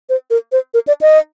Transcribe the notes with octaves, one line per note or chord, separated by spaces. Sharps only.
C5
A#4
C5
A#4
D5
D#5